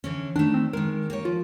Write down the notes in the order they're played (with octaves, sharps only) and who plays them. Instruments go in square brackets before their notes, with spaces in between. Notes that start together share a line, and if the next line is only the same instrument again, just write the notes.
[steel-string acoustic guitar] D3 E3 C#4
[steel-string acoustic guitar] D#3 A3 [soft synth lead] D4
[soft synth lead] C4
[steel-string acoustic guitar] D#3 G#3 [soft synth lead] A#4
[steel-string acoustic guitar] A#3 G4 C#5
[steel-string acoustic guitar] F3 [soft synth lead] F4